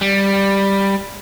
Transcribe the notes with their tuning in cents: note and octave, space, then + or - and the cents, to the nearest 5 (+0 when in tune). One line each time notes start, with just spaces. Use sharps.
G3 +5